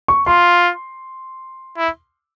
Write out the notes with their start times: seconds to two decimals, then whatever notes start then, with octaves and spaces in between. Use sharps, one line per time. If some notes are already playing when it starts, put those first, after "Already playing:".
0.08 C#6
0.26 F4 C6
1.78 E4